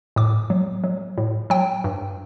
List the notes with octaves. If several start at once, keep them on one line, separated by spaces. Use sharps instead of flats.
A2 D6
F#3
F#3
A2
F#3 G5
G2